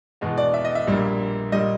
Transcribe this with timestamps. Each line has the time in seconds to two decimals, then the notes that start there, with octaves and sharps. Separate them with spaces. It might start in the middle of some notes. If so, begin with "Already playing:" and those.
0.21 E2 B2 G#3 B3
0.38 D5
0.54 E5
0.65 D#5
0.75 E5
0.87 A#1 A#2 G3 A#3
1.52 A#2 G3 D#5